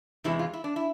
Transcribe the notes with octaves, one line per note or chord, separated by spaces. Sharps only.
E2 C3 E3 G#3 E4
F4
E4
D4
E4